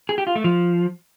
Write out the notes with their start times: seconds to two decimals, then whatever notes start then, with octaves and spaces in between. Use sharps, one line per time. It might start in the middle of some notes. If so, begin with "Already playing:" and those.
0.09 G#4
0.18 G4
0.27 F4
0.36 A3
0.44 F3